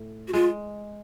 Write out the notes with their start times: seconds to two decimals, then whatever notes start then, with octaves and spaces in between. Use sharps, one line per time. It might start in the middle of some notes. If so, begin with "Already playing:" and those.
Already playing: A2
0.28 F#4
0.33 G#3 F4